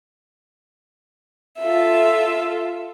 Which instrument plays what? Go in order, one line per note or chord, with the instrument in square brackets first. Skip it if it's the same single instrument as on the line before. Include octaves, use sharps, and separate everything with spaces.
[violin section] F4 A4 [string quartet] E5